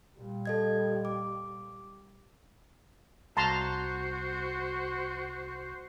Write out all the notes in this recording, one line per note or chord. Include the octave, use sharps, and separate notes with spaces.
A#2 G3
A4 D#5 G#6
D6
C2 F#4 C5 A5 A#5 C6